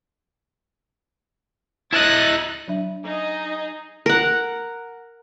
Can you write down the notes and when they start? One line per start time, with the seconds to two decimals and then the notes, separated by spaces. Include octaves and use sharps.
1.93 E4 D#5 F#6 A6
2.68 F#3 D4 E5
3.05 D#4 G#4 D#5
4.06 A#4 F#5